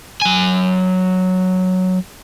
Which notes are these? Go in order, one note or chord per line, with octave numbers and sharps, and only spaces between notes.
F#3 G#5